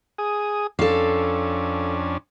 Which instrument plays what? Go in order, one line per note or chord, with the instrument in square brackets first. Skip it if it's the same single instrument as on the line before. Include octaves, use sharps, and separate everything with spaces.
[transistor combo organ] G#4 D#6
[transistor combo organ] F2 C#4 D4 [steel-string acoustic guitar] A4 F5